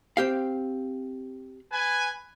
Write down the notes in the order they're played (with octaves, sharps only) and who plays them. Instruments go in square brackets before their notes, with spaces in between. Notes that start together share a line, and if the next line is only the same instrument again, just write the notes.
[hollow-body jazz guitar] C4 G4 F5
[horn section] B4 G#5